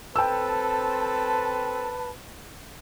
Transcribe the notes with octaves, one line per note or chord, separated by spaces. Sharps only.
C4 A4 B4 G5 A5 E6